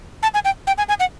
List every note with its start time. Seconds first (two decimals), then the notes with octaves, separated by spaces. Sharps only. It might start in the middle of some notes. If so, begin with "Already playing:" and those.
0.23 A5
0.34 G#5
0.45 G5
0.67 G5
0.78 G#5
0.89 G#5
1.00 F#5